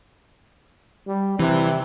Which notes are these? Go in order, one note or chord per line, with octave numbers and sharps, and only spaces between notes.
G3
C3 E3